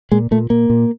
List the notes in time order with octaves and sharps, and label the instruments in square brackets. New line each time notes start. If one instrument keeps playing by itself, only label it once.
[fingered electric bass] A#2 G#3
A#2 A3
A#2 A#3
A#2